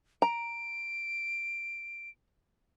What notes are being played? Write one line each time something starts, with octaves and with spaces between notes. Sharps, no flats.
A#5 D7